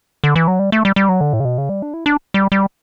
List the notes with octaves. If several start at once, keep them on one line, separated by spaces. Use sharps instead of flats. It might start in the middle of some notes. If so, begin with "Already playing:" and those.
D3
E3
F#3
G3
A3
G3
G3
F#3
D3
A2
C#3
B2
C#3
G3
D4
E4
D4
G3
G3